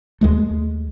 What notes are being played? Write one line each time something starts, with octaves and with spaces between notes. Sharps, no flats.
D#2 G#3 A3